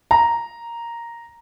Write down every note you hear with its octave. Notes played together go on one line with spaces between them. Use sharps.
A#5